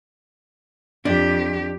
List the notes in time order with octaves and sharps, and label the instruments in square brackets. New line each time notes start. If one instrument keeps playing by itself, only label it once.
[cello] F2 G4 [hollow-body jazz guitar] D4